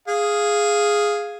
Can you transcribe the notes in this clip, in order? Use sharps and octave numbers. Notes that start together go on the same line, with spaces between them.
G#4 F5